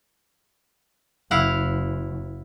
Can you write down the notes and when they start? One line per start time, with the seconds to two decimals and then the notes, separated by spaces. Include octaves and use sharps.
1.31 F#1 E4 F5 F#5